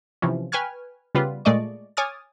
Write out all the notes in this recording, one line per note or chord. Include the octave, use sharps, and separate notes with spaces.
C3 E3 F3 C#4
B4 G5 G#5 C#6 F6 G#6
C#3 G3 B3 F4 B4
A#2 G#3 A3 D5 D#5 C#6
C#5 G#5 D6 D#6 F6 A6